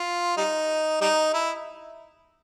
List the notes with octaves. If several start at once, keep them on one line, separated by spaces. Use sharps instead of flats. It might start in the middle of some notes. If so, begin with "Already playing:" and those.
Already playing: F4
G3 D#4
G3 D#4
E4